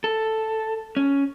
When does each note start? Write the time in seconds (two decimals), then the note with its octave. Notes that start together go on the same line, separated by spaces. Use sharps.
0.04 A4
0.97 C#4